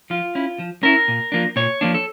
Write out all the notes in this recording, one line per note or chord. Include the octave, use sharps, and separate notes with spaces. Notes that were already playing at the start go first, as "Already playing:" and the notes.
F3 F4
C#4 E4
F3
C#4 E4 A#4
A#2
F3 A#3 D4
A#2 C#5
F3 A#3 D4
A4